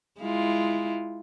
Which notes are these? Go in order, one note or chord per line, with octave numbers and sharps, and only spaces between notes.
G#3 E4 F4